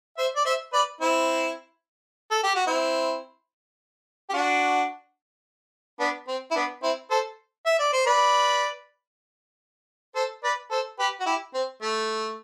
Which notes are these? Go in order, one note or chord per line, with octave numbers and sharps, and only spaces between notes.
C5 E5
D5
C5 E5
B4 D5
C4 E4
A4
G4
F#4
C4 E4
G4
D4 F#4
B3 D4
C4
E4
B3 D4
C4 E4
A4 C5
E5
D5
C5
B4 D5
A4 C5
B4 D5
A4 C5
G4 B4
F#4
E4 G4
C4
A3